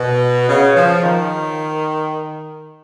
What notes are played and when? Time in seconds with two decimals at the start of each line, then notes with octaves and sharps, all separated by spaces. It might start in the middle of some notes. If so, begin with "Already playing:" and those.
Already playing: B2
0.49 C#3
0.76 F3
1.03 D#3